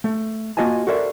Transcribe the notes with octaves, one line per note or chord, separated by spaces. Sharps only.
A3
A#3 F4 F#4 D#5 G#5 A5
F#4 A4 A#4 C5 D5 E5